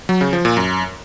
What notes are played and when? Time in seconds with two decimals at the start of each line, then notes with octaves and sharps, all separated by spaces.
0.09 F#3
0.21 C#3
0.33 F3
0.45 A#2
0.57 F#2